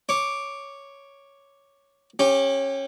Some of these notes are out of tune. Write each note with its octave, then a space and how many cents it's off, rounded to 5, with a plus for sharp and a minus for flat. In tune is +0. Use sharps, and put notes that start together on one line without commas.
C#5 +0 D6 +0
C#4 -20 G4 +5